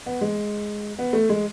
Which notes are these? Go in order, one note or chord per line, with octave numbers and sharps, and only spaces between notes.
B3
G#3
B3
A3
G#3